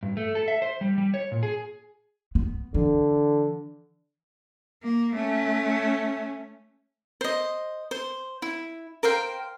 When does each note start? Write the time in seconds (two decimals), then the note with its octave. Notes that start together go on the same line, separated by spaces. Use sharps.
0.03 G2
0.17 A3
0.35 A4
0.48 E5
0.62 C5
0.81 G3
0.98 G3
1.14 C#5
1.32 A#2
1.43 G#4
2.35 B3
2.74 D3 E3
4.83 A#3
5.14 A3 C#4
7.21 C5 D#5
7.91 C5
8.42 E4
9.03 A#4 C5 F5 G5